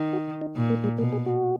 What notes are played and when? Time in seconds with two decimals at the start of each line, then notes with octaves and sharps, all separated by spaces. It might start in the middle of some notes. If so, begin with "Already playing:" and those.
Already playing: D#3
0.13 F#4
0.41 D#4
0.56 A#2
0.70 A#3
0.84 G#3
0.98 B2 A#3
1.12 G#4
1.26 F#4